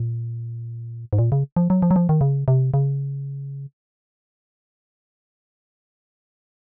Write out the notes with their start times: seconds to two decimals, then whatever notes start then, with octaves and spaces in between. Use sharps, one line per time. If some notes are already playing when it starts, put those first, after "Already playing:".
Already playing: A#2
1.13 G#2
1.19 A#2
1.32 C#3
1.56 F3
1.70 F#3
1.82 F3
1.91 F#3
1.96 F3
2.09 D#3
2.21 C#3
2.48 C3
2.74 C#3